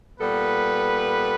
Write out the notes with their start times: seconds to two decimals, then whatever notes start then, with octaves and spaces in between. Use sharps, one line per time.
0.20 A#2 G3 B3 A4 B4